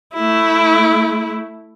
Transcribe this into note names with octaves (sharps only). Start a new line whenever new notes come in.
A3 E4